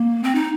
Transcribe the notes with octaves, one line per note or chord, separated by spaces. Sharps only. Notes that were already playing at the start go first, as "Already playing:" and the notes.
Already playing: A#3
C4
D#4